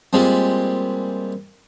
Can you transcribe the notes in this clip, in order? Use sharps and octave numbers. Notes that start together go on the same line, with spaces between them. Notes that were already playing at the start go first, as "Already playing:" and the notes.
A#2 G3 G#3 C4